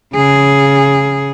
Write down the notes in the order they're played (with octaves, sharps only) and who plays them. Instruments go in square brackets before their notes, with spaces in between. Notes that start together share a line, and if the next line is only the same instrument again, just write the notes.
[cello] C#3 G#4